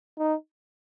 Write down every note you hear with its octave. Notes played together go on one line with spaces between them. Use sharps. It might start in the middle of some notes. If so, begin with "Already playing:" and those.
D#4